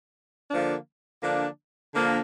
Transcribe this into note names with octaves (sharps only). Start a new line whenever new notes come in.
D3 F3 A#3 D4
D3 F3 A#3 D4
D3 F3 A#3 D4